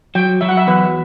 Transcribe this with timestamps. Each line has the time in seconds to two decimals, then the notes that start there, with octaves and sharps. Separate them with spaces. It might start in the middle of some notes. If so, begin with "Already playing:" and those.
0.15 F#3 G5
0.41 F#3 E5
0.49 F#5
0.57 E5
0.67 E2 B4